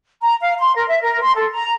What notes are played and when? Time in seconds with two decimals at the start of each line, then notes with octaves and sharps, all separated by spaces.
0.22 A#5
0.41 F5
0.59 C6
0.76 A#4
0.88 E5
1.01 A#4
1.21 C6
1.35 A4
1.51 A#5